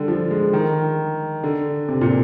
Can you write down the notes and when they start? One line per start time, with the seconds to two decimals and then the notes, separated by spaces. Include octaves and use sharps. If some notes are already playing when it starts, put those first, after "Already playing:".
Already playing: D3 G3
0.08 F3
0.31 G#3
0.53 D#3
1.44 D3
1.88 C3
2.01 A#2